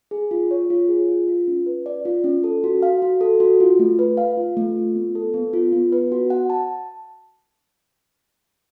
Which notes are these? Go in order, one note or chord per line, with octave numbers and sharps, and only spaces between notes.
G#4
F4
C#5
F4
G#4
F4
F4
C#4
B4
D5
F4
C#4
A4
F#4
F5
F#4
A4
F#4
F4
A3
B4
F5
F4
A3
F4
B3
A4
B3
F4
B3
B4
F#4
F#5
A5